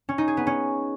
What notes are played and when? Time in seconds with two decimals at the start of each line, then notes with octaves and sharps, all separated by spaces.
0.09 C#4
0.18 D#4
0.28 G#4
0.37 B3
0.47 C#4